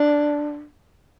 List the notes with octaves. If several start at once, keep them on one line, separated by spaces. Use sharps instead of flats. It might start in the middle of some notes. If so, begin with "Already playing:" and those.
Already playing: D4